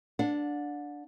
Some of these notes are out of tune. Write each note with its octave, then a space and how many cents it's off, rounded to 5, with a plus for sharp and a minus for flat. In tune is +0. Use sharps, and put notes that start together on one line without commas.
D4 +0 F#5 -35